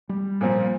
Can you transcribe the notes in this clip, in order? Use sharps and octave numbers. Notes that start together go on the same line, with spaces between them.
G3
A#2 F3 A#3